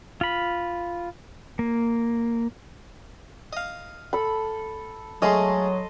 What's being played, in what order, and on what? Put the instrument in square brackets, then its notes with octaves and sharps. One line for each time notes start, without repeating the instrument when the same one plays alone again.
[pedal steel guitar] F4 B5
A#3
[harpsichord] D#5 F5
[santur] A4 B5
[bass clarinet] F#3 [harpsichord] G#3 A3 C#4 [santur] D#5 A5 C6